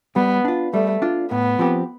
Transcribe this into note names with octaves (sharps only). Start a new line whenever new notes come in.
G3 B3
D4 F4
G3 A3
D4 F4
A2 B3
F3 C4 G4